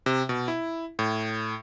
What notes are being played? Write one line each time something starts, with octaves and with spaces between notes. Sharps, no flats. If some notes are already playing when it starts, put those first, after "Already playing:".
C3
B2
E4
A2